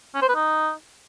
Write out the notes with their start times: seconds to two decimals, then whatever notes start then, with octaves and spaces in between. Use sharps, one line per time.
0.15 C#4
0.22 C5
0.28 B4
0.35 D#4